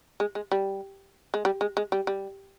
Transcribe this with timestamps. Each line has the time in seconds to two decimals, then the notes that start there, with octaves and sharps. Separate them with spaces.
0.20 G#3
0.35 G#3
0.51 G3
1.34 G#3
1.45 G3
1.61 G#3
1.77 G#3
1.92 G3
2.07 G3